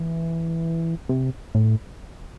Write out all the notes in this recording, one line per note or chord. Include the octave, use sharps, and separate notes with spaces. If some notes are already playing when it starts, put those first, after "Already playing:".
Already playing: E3
C3
A2